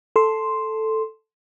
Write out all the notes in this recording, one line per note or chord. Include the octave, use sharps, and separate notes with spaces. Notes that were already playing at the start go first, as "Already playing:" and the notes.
A4 C6